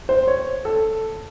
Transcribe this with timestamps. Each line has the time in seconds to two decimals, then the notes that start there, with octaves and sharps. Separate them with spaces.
0.09 C5
0.27 C#5
0.65 A4